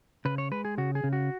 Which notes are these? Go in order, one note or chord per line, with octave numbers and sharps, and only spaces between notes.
C#3 B4
C#5
G#3 B4
G#4
C#3 F#4
G#4
C#3
F#4